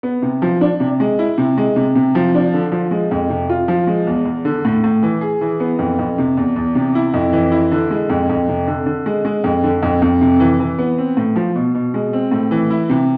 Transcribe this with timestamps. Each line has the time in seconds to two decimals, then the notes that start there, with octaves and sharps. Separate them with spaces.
0.03 B3
0.22 C3
0.42 F3
0.61 D4
0.80 C3
1.00 G#3
1.19 E4
1.38 C3
1.57 G#3
1.76 C3
1.95 C3
2.15 F3
2.34 D4
2.54 D3
2.72 F3
2.91 G#3
3.11 F2
3.29 C3
3.49 F4
3.68 F3
3.87 G#3
4.07 E2
4.25 E2
4.45 D3
4.65 A2
4.84 A2
5.03 E3
5.21 G#4
5.41 E3
5.60 B3
5.79 F2
5.99 F2
6.18 C3
6.37 E2
6.56 E2
6.75 C3
6.95 E4
7.14 F2
7.33 E3
7.52 E4
7.71 D3
7.90 G#3
8.10 F2
8.29 F2
8.48 C3
8.67 D3
8.86 D3
9.06 G#3
9.25 G#3
9.44 F2
9.64 D3
9.83 F2
10.02 F2
10.21 C3
10.40 E3
10.60 E3
10.79 B3
10.98 C4
11.17 A2
11.36 F3
11.55 B2
11.75 B2
11.94 G#3
12.13 C4
12.32 A2
12.51 E3
12.70 E4
12.90 C3